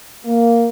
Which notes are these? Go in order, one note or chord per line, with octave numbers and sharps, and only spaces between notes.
A#3